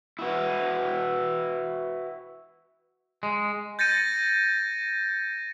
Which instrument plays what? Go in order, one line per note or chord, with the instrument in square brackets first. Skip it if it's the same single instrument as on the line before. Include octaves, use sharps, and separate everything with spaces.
[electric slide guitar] E4 F#4 B4
[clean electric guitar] G#3
[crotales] G6 A6 A#6 C#7 D#7